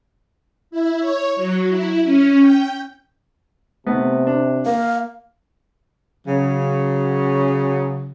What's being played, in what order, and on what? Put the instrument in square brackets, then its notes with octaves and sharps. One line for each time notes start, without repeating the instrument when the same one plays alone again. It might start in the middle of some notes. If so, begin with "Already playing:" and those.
[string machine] E4
C#5
F#3
E4
C#4
G5
[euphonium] C3 [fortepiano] A3 B3 D#4
[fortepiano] D4
[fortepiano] A#3 [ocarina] F5
[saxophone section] C#3 F#3